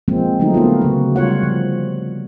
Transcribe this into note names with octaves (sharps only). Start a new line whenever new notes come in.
F3 G#3 A#3 C4
D3 F3 F#3 A3 D#4
A#3 B3 F4
C#3 F#4
G3 F4 C#5 F#5
F3